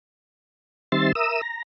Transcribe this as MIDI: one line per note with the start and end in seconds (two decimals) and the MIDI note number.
0.92 1.12 51
0.92 1.12 55
0.92 1.12 60
0.92 1.12 76
0.92 1.12 84
0.92 1.12 93
1.15 1.41 70
1.15 1.41 76
1.15 1.41 87
1.15 1.41 88
1.42 1.63 82